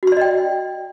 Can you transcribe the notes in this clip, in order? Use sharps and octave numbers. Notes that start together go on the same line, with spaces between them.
F#4 D5 D#5 G5 C6